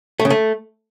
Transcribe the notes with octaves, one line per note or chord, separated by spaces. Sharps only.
A3
C#3
A3